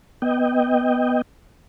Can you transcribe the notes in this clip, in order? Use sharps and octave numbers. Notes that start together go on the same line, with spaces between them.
B3 D#5 G5